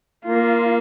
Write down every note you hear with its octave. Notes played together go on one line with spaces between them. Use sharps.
A#3 F4